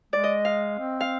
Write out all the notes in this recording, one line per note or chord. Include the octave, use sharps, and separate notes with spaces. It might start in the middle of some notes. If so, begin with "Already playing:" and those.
G#3 D5
D#5
F5
C4
F5